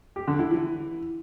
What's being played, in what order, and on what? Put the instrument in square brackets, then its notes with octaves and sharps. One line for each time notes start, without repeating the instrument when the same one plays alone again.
[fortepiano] G4
D3
E4
E3